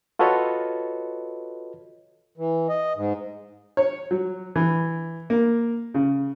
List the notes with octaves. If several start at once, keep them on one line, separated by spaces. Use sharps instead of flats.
F4 F#4 A4 B4 C#5 D#5
E3
D#5
G#2
C#5
F#3
E3
A#3
C#3